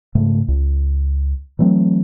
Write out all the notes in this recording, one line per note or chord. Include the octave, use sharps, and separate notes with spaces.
G#2 C#3 A3
C#2
E3 F#3 A3 C4